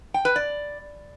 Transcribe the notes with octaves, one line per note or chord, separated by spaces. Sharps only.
G5
B4
D5